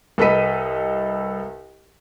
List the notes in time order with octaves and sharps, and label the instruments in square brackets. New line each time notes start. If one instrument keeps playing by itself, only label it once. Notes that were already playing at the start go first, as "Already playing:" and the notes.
[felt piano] C2 A4 B4 D#5 B6 D#7